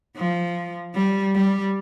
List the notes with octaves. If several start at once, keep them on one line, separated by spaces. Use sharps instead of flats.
F3
G3
G3